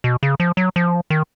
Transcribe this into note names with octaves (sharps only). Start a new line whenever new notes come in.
B2
C#3
F3
F#3
F3
D#3